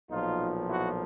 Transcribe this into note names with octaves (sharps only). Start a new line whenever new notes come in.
B1 A#2 F3 D#4 F4
E4 F#4